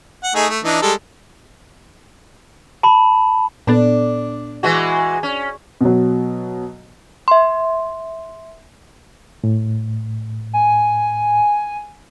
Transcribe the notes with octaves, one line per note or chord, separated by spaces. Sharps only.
F#5
A3 D#4 G#4
A3
E3 D4 D#4
G3 G#3 A4
A5 B5
A#2 B3 D4 A4
E3 G#3 F#4
C#4
B2 F#3
E5 C6
A2
G#5